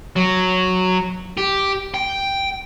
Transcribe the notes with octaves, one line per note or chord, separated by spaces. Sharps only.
F#3
G4
G5